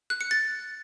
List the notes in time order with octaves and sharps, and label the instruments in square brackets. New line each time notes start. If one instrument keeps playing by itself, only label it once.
[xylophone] F#6
C#7
A6